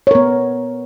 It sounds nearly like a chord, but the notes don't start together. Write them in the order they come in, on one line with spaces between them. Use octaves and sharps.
C#5 A#4 B3